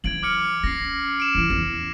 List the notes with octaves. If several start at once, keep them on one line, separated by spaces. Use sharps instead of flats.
E3 F#3 G#6 D7 F#7
D6 F6 C#7
C#4 A#6 C7
D7 E7
A2 E3
E2 C#4